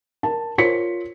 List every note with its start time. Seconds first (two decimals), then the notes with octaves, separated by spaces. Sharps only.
0.23 A#4 A5
0.58 F4 A#4 C5 C#5 B6 C#7